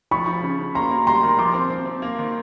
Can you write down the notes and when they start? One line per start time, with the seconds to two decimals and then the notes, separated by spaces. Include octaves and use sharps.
0.11 F3 B5 C#6
0.27 F3
0.43 C#3
0.59 C#3
0.75 A#3 A#5 C6
0.91 A#3
1.06 G3 A#5 C6
1.23 D#3
1.38 F3 C6 D6
1.54 C4
1.70 C4
1.86 C4
2.02 A#3
2.19 D#3